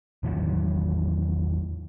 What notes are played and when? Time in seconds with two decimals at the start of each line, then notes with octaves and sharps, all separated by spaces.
0.23 E2 A2 D#3 F#3